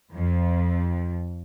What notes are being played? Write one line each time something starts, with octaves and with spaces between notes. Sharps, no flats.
F2